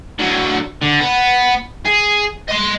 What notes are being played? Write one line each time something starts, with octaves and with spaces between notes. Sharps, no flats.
D3 F#3
D3
B3
G#4
D#5 C6